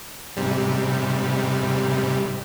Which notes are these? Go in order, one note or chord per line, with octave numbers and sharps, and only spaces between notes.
G#2 C3 G3